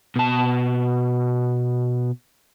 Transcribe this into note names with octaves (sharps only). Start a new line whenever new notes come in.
B2 A5